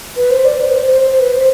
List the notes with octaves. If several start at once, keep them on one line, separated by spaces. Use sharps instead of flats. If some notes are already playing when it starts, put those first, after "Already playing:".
B4
C5
D5
C5
B4
C5
C5
C5
B4
C5